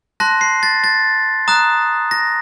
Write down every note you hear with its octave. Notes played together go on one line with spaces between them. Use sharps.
A5 C6 F#6 A#6
C7
A6
A6
A#5 D#6 F#6
A#6